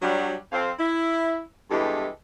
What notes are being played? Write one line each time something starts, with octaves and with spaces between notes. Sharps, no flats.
F#3 G3 D4
F2 C4 F5
E4
E2 G2 E3 G#3 G4 A4